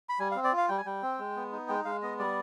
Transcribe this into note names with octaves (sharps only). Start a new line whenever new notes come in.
B5
G3 G#5
F5
C4
D5
F4 F5
G3 G5
G#5
G3 G5
C4
G#3
B3
D#4
G#3 G5
G#3 F5
B3 D#5
G3 D5